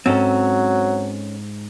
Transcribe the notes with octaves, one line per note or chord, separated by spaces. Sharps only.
G#2 F#3 C4 C#4 A4